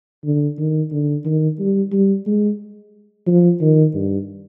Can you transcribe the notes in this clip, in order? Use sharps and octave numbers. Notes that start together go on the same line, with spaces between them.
D3
D#3
D3
D#3
G3
G3
G#3
F3
D#3
G2